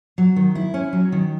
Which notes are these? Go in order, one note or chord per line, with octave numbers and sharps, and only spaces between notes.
F#3
D#3
E4
C#4
F#3
D#3